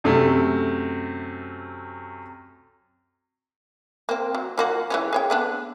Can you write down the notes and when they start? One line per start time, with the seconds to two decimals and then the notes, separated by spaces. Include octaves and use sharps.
0.04 F#2 C3 A3
4.09 A#3 C4
4.35 F#3
4.58 F3 A#3 F#4
4.90 E3 G#3 C#4
5.13 G#4 C#5 G5
5.30 A3 B3 D4